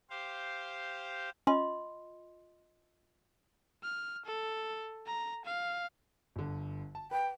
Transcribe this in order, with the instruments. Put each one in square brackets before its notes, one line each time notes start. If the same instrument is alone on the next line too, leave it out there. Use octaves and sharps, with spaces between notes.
[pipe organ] G4 C5 F5
[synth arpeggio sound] C#4 [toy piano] F4 D#5 C6
[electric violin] F6
A4
A#5
F5
[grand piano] G1 D3
A5
[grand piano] B4 [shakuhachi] G5